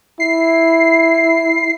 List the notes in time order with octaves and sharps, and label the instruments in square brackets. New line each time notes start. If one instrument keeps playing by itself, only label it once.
[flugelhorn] E4 [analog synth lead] C7